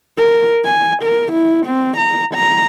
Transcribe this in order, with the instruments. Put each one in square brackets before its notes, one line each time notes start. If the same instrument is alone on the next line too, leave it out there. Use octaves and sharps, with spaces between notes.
[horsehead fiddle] A#4
G#5
A#4
E4
C4
A#5
A#5